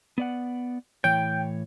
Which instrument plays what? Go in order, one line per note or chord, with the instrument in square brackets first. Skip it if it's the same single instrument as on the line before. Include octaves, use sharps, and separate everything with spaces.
[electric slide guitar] B3 D5 F#5
[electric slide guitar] A2 E3 C#5 [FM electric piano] G5